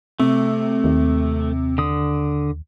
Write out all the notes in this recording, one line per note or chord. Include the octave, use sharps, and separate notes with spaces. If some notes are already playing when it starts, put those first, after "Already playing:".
C3 A3
D#2
D3 D#6